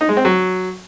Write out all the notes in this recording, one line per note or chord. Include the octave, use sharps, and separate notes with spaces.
D#4
G#3
C4
F#3